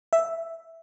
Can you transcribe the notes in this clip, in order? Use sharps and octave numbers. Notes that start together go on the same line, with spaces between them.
E5